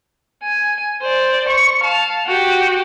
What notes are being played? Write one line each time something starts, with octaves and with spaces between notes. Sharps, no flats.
G#5
C5 D5
C#6
F5 A5
F#4 G4